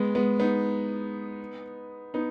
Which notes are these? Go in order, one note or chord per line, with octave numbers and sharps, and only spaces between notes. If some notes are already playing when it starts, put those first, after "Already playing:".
Already playing: G#3 B3
G#3 B3
B3 D#4
B3 D#4